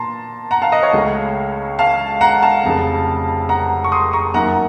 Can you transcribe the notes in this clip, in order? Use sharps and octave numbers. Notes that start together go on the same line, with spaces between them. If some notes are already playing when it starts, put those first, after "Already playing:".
Already playing: A#2 A5 A#5 C6
F#5 A#5
F5 A5
D#5 F#5
C#5 F5
C#2 C#3 A3
F5 A5
F#5 A#5
F5 A5
F1 F2 C#3
F#5 A#5
C#6
C6 D#6
A#5 C#6
F#2 D#3 A#3 F#5 A#5